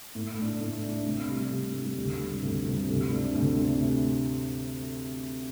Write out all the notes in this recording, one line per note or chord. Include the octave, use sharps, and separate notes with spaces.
A2
A3 D4
A2
A3 D4
C3
G3 D4
C3
G3 D4
D2
C3 G3
D2
C3 G3
D2
C3 A3 D4
D2
C3 A3 D4